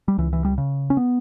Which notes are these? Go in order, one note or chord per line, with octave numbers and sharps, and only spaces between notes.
G3
C#2 E3
E3
G3
C#3
C#4
B3